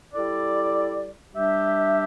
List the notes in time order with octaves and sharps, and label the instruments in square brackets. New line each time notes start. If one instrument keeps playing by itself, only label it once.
[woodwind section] G3 E4 A4 D5
G3 D4 G4 E5